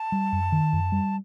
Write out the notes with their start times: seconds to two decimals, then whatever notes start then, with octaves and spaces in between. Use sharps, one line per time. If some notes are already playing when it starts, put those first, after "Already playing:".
Already playing: A5
0.12 G3
0.32 F#2
0.52 D#3
0.73 F#2
0.92 G3